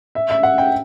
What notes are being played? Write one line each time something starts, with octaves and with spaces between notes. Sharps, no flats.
E5
E5
F#5
G5